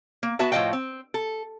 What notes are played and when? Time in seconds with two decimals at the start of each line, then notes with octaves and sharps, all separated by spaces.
0.23 A#3
0.39 B3 F#4 B4 E5 A5
0.52 A2 F3 F#4 D#5 F5 G5
0.73 C4
1.14 A4